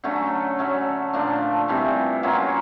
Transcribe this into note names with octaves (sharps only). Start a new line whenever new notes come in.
D3 F#3 A3 C#4
D3 F#3 A3 C#4
A#2 F3 A3 D4
C3 E3 G3
F#3 A#3 C#4 F4